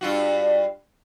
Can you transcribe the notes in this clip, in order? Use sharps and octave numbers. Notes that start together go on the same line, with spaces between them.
G2 F4 F#4